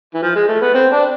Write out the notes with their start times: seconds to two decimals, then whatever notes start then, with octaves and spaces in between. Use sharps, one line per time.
0.14 E3
0.22 F3
0.35 G#3
0.48 A3
0.61 B3
0.74 C4
0.92 D4